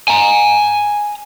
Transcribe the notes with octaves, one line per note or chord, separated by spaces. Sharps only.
G#5 A#5